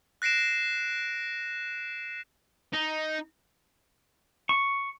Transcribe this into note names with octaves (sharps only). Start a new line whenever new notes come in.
F#6 A#6 C7 D7 E7
D#4
C#6